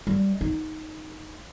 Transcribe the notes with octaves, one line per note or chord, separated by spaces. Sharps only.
G3
D#4